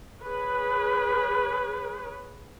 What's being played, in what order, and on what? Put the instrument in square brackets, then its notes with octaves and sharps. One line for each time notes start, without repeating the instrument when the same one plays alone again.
[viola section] G#4 B4 C#5